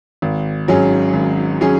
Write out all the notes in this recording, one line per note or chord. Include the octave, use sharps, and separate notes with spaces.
G#1
G#2 F#3 C#4 G#4
G#1
F#3 C#4 G#4